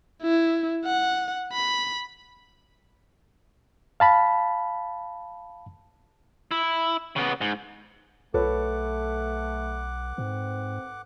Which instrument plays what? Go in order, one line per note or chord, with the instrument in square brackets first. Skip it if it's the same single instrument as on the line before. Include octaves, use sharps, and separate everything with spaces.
[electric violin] E4
F#5
B5
[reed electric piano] F5 A5 B5
[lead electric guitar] E4
C#3 B3
G#2
[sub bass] B1 [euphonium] A3 [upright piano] A4 B4 C#5 [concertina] F#5 D6
[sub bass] G#2 [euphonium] C4